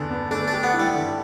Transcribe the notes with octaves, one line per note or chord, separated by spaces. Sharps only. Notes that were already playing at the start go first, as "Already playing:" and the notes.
Already playing: E2 D3 D4
B3
A3 D4
D4
G4
B3
E4
G3
D3